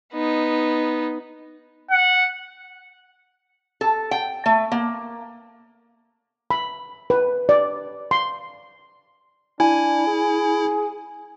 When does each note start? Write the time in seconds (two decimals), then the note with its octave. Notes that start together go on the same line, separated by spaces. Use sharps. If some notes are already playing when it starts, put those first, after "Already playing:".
0.13 B3 D#4
1.91 F#5
3.81 A4
4.11 G5
4.46 A3
4.72 A#3
6.51 B5
7.10 B4
7.49 D5
8.11 C6
9.60 D4 E4 G#5
10.07 G#4